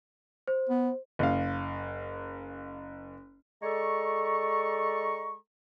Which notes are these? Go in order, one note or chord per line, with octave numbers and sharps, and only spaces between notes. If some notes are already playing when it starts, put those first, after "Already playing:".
C5
B3
F#1 F5
G#3 A4 D5 A#5 C#6